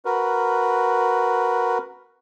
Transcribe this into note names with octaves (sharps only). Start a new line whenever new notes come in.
F#4 A#4 B4